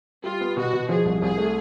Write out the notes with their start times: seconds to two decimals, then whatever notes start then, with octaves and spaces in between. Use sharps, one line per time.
0.24 G3 F4
0.41 B3
0.56 B2 F#4
0.73 B2
0.89 F3 G#4
1.05 C2
1.21 C2 G#4
1.38 A3